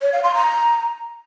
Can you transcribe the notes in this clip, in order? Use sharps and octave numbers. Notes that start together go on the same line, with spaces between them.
C#5
F5
C6
A#5